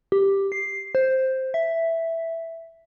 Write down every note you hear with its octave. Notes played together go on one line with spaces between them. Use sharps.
G4
C7
C5
E5